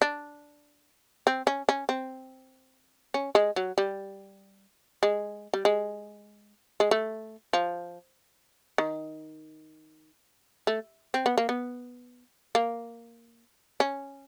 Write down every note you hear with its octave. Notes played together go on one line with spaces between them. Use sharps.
D4
C4
C#4
C#4
C4
C#4
G#3
F#3
G3
G#3
G3
G#3
G#3
A3
F3
D#3
A3
C4
B3
A#3
B3
A#3
C#4